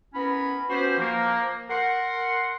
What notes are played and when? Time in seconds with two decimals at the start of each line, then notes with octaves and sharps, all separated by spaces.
0.14 B3 C#4 E4 A#4 B5
0.69 B3 C#4 F#4 G4 C5
0.98 F3 A#3
1.70 A#4 F#5 C6